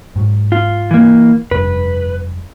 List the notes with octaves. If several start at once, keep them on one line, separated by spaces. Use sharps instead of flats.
G#2 F#3
F4
E3 A#3
F1 G2 B4